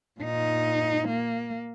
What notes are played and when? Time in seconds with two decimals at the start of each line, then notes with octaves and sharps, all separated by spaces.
0.21 A#2 D#4
1.08 A#3